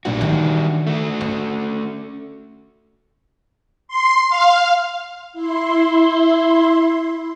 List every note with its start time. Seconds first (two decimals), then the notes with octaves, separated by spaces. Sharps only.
0.05 A#1 G3 D4 F#4
0.21 D#3 E3
0.87 A3 F#4
1.21 C#4
3.88 C6
4.29 F5
5.33 E4 C6